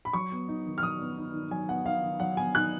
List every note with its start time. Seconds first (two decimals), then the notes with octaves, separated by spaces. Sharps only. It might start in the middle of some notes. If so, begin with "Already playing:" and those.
0.05 B5
0.13 F#3 C#6
0.32 B3
0.48 D#4
0.66 D#3
0.78 F6
0.83 F#3 D#6
1.00 B3
1.17 D#4
1.34 D#3
1.51 F#3 G#5
1.69 B3 F#5
1.86 D#4 F5
2.02 D#3
2.20 F#3 F#5
2.37 B3 G#5
2.55 D#4 F#6